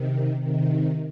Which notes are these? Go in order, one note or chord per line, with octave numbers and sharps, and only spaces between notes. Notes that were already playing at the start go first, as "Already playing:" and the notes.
Already playing: C3 D#3
C3 D#3